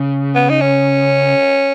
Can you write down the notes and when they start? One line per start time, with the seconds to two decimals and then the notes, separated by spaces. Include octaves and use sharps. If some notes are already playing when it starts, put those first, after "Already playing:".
Already playing: C#3
0.35 B3
0.50 D#4
0.61 C#4